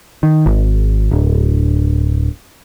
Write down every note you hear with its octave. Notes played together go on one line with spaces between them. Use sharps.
D#3
G#1
D1